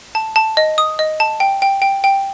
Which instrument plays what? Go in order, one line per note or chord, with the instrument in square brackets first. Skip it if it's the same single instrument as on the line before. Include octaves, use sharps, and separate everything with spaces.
[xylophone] A5
A5
D#5
D#6
D#5
A5
G5
G5
G5
G5